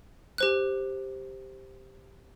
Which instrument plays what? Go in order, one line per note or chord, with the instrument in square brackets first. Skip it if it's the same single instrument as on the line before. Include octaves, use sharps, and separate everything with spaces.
[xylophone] G4 C5 F#6